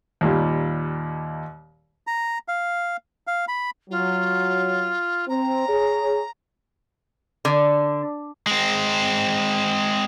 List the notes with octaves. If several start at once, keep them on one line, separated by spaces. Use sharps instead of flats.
D#2 A#2 G3
A#5
F5
F5
B5
F#3 F4
C4 A#5
G#4 C#5
D3
G#3 C4